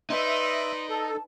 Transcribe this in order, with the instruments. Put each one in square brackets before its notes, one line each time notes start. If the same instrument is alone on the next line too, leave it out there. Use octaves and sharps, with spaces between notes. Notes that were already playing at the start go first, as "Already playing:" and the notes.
[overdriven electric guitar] D#4 [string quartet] B4 D5 [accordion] E5 [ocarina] C6
[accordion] A4 [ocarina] A5